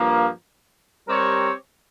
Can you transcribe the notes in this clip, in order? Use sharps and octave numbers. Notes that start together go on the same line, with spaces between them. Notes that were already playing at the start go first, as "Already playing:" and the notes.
Already playing: G2 F3 A#3
G3 C4 G4 A#4 C#5